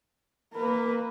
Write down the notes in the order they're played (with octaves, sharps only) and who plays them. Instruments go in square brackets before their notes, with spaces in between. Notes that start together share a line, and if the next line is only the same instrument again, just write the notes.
[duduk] A#3 [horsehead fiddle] A#4 B4